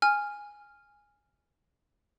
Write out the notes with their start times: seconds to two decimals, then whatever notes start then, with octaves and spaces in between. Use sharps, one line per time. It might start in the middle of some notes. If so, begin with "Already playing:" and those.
0.02 G#5 F6